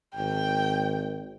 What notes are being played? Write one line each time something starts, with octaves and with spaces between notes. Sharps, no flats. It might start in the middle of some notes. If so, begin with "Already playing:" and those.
G#1 G5